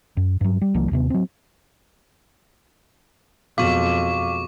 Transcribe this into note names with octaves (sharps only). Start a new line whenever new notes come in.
F#2
G2 F#3
G3
C2 E3 F#3 A#3
D#2 C3 B3
F#3 C4
F2 B2 F#3 G#3 F5 C#6 D6